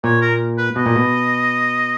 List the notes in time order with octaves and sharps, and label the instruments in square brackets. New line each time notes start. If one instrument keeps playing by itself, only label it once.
[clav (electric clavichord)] A#2 [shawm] C#5
[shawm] A#4
B4
[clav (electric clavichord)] B2 [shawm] D#5
[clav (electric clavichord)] A#2
B2